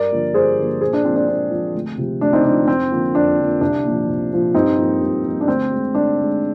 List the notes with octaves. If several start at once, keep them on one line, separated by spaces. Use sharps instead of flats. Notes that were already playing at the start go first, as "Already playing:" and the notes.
Already playing: G2 A#4 D5
D3 F3 A#3
G2 G#4 C5
D3 F3 A#3
A#2 G#4 C5
D4
F3 A#3 C4
D4
A#2 C4
F3 A#3
D2
C3 F3
D2 D4
C4 D#4
C3 F3 D4
F2 C4
D3 F3 A#3
F2 D4
D3 F3 A#3
C2 D4
A#2 F3
C2
A#2 F3
G2 C4 D#4
F3 A#3
G2
F3 A#3
D4
D2 C4
D3 G#3
D2 D4
D3 G#3